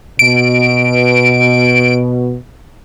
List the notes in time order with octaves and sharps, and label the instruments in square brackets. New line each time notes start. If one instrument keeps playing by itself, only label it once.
[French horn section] B2 [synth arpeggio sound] D7